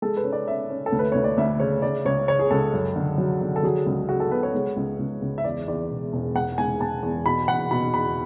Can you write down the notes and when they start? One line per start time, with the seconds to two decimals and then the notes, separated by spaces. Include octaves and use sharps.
0.02 G#3 A4
0.17 B4
0.24 C#4
0.33 D5
0.47 C#4 E5
0.70 C#4
0.86 A4
0.92 D2
0.99 B4
1.12 D2 C#5
1.24 D5
1.38 D2 E5
1.60 C#3 C#5
1.82 C#3 D5
2.05 C#2 C#5
2.28 C#3 C#5
2.39 G#4
2.51 C#2 A4
2.73 F#2
2.96 D3
3.18 F#3
3.41 D3
3.56 A4
3.63 F#3 G#4
3.86 C#2
4.09 C#3 F#4
4.20 A4
4.31 B3 B4
4.43 C#5
4.54 G#3
4.76 C#2
4.99 C#2
5.22 C#2
5.38 E5
5.44 E2 D5
5.68 E2 D5
5.90 E1
6.13 E1
6.35 G#3 F#5
6.58 G#3 G#5
6.81 G#3 A5
7.03 E2
7.26 B2 B5
7.48 E2 F#5
7.71 B2 B5
7.94 E2 B5